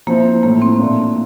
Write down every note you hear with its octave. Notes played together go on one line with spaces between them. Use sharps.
F3 A#3 C4 E4
A2 E3 A3 A#3
C4
A#2 A3 D4